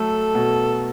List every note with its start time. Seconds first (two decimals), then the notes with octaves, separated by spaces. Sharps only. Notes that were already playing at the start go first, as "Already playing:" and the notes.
Already playing: F#3 A3 A4
0.35 B2